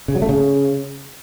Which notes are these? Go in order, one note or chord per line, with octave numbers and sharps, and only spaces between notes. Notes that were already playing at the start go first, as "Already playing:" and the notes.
C#3
F#3
A3
C#3